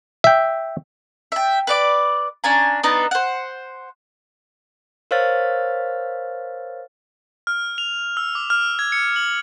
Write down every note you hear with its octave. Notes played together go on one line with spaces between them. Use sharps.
E5 G5
E5 G5
B4 D5 D6
C#4 D4 G#5 A#5
B3 D4 D#4 B4
C5 F#5
A#4 C5 C#5 F5 F6 A6
F6
F7
E6
D6
F6
G#6
C#7
F#7